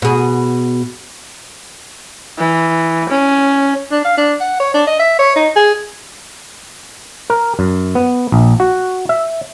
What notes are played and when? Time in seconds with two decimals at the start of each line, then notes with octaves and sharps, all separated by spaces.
0.02 B2 G#4
2.38 E3
3.09 C#4
3.92 D4
4.04 F5
4.18 D4
4.40 F#5
4.60 C#5
4.74 D4
4.87 D#5
4.99 E5
5.19 C#5
5.36 D#4
5.56 G#4
7.30 A#4
7.59 F#2
7.95 B3
8.32 A#1
8.60 F#4
9.09 E5